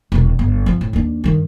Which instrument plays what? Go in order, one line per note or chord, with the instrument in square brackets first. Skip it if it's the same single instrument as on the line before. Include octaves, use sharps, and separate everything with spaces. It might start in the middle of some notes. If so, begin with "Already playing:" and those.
[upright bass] E1 C2
G1
F3 C4
A2
D#2 D4
G2 D#3